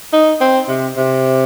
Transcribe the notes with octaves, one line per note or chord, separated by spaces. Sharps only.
D#4
C4
C3
C3